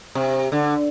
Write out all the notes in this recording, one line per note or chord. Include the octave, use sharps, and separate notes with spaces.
C3
D3